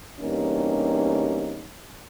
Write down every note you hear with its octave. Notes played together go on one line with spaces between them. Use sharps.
E2 G2 C3 A#3 C#4 D#4